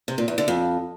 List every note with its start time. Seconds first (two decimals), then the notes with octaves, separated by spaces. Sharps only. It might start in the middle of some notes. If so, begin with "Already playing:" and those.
0.08 C3
0.18 A#2
0.28 E2
0.38 D3
0.48 F2